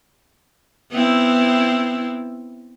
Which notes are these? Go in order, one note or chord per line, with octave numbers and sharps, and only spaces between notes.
B3 C4 E4